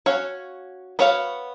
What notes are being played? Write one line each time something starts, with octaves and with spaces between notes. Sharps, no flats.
C#4 F#4 C#5 F5
B3 F#4 C#5 F5